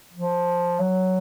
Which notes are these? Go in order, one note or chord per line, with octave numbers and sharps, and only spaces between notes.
F3
F#3